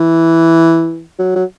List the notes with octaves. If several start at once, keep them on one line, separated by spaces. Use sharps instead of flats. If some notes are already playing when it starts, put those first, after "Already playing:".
Already playing: E3
F#3
F#3